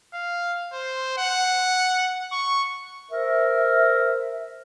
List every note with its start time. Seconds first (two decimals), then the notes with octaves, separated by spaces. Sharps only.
0.13 F5
0.72 C5
1.18 F#5
2.32 C#6
3.11 A#4 C5 E5